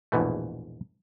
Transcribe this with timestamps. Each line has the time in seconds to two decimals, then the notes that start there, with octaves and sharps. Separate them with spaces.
0.12 A#1 E2 G#2 B2 E3 A3